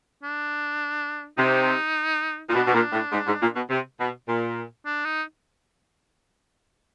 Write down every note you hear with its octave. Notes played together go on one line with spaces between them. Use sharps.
D4
C3 D#4
A#2 D#4
B2 D4
B2
A#2
A2
G#2
G#2
A#2
B2
C3
B2
A#2
D4
D#4